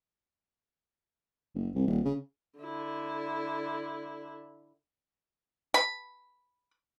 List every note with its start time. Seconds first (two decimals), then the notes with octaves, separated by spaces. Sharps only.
1.55 F#1
1.75 C2
1.87 D#1
2.05 C#3
2.59 D3 E4
5.74 B5